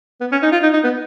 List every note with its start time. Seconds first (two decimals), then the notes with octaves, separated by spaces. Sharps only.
0.21 B3
0.32 C#4
0.42 D#4
0.52 F4
0.63 D#4
0.73 D#4
0.84 B3